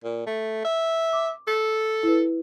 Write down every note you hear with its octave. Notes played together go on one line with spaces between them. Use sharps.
A#2
A3
E5
D6
A4
E4 B4